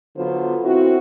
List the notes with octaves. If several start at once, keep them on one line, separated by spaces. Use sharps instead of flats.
D3 F#3 B3 F4 C5
C4 E4 F#4